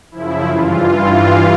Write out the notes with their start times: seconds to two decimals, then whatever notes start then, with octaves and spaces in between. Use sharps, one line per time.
0.11 F#2 C#3 F3 E4
0.45 G2 E3 F4